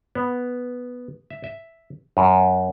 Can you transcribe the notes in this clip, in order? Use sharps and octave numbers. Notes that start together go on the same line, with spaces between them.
B3
E5
E5
F#2